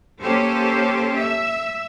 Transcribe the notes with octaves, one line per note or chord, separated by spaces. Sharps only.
A#3 C#4 G4 A4 C5
E5